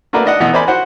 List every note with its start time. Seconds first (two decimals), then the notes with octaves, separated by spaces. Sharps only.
0.13 A3 A#3 F#4 A#4 B4 D5
0.25 D4 D#5 F#5
0.40 B1 E3 B3 A4 D#5
0.53 A#4 C5 D5 G#5 B5
0.68 F#4 C5 F#5